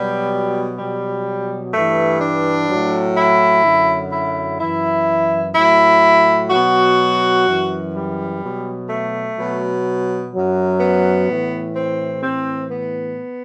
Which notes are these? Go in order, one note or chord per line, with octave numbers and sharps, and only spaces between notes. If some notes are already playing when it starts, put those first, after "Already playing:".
Already playing: B2 F#3 G3
B2 F#3 G3
G2 E3 A3
D4
A2 F#3
E4
F#2 D3 F#3
E4
F#2 E3 E4
A2 F#3 E4
B2 F#3 F#4
F#2 E3
G3
B2 F#3
A3
B2 F#3
F#2 F#3
B3
A2
E3
C4
A2 E3 C4
B3